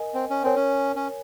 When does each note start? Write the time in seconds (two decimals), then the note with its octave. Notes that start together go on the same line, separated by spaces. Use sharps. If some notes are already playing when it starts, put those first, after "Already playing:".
Already playing: A#4 D#5 G#5
0.14 C4
0.30 C#4
0.43 C4 A#4 C#5 G#5
0.56 C#4
0.96 C#4